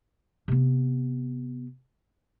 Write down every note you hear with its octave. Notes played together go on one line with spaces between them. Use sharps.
C3 B3